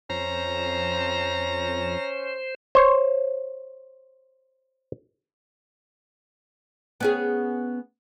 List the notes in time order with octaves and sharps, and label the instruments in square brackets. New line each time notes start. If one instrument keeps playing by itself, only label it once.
[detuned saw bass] F2 [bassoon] C#4 [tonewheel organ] C5 [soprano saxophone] A#5
[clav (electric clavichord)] C5 C#5
[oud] B3 C#4 G#4